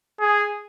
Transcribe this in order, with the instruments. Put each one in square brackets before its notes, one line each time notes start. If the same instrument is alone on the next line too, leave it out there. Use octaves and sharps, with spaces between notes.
[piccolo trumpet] G#4